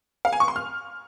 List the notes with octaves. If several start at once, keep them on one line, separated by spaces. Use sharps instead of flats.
F5
G#5
C#6
C6
F6